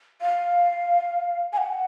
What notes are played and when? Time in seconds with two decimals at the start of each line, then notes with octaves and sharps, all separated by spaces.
0.22 F5
1.53 G#5
1.58 F#5